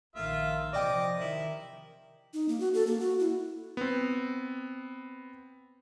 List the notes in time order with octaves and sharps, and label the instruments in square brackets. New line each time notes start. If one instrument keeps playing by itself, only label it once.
[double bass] A#1 D#3 [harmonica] F4 E5
[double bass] C3 F3 [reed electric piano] D5 G5 [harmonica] D#5 D6
[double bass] D#3 [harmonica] E4
[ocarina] D#4
A#3
F#4
A4
A#3
F#4
E4
[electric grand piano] B3 C4